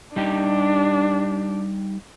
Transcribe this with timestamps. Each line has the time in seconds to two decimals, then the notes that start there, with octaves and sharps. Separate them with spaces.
0.16 G3 D4 D#4 G4